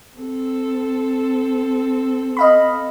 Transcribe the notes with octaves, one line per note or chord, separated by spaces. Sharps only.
C4 A4
D#5 F5 B5